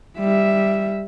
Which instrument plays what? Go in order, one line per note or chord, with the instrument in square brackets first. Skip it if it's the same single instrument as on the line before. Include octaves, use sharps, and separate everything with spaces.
[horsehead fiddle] G3 E5